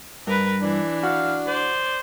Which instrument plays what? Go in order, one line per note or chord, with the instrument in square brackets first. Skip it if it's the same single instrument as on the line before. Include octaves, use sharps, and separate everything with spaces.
[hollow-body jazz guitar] G2 [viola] A#4 B4
[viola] E3 [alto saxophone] D4
[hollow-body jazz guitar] F#4 [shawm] F5
[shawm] C5 [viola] D5